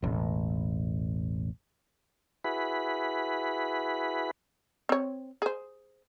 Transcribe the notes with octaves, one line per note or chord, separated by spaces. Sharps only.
E1 A1
E4 F#4 G#4 B4 B5
C4 C#5
G#4 C5